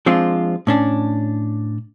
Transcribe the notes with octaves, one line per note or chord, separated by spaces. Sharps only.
F3 G#3 C4 D4 F4
A2 C#4 D4